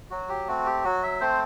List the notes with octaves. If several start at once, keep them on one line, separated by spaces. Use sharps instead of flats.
F#3 F#4
G4
A3 C4 F#4
G4
F#3 F#4
E5
A3 C4 C5